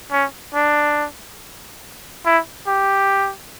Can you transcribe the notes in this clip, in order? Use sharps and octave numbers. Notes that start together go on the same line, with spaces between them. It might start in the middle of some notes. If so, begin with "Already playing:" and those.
C#4
D4
E4
G4